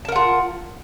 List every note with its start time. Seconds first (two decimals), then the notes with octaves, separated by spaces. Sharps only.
0.05 A5
0.08 A#4
0.12 F#5
0.16 F4